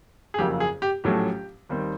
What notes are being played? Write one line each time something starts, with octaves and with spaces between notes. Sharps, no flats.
G#4
F#1 F2 C#3 F#3 A#3 G4
G#4
G4
A#1 A2 F#3 A3 C#4 G4
D#2 D#3 G3 C4